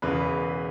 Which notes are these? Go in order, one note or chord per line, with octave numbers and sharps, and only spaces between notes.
E1 E2 C#3 E3 B4